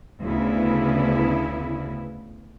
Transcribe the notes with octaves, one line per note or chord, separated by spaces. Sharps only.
D2 C#3 B3 E4